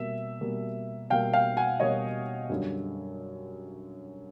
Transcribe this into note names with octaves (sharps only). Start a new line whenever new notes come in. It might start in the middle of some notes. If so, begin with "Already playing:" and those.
Already playing: B2 G3 A#3 E5
B2 G3 A#3
B2 G3 A#3 F5 G5
F5 G5
F#5 G#5
B2 G3 A#3 C#5 D#5
F#2 D3 G3